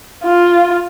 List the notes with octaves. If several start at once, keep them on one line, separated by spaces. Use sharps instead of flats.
F4